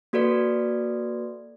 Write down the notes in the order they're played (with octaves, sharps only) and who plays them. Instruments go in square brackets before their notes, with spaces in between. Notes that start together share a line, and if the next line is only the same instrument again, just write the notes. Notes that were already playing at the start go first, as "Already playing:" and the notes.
[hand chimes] A#3 F#4 A4 B4 D5